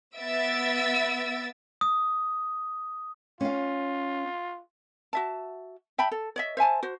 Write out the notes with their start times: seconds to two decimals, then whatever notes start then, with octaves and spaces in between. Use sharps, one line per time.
0.18 B3 E5 E6 A6 D7
1.81 D#6
3.41 C#4 F4 F5
5.13 F#4 E5 A5
5.98 E5 G5 A5 B5
6.11 A4
6.36 C#5 D#5 E5
6.57 C5 E5 G#5 A5
6.83 F#4 C5